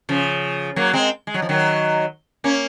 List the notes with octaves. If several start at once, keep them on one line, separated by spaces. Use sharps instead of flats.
C#3 F3
F#3 A#3
G#3 C4
G#3
F#3
F3
D#3 F#3
A#3 C#4